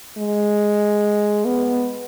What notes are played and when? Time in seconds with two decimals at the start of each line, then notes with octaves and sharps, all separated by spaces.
0.18 G#3
1.45 B3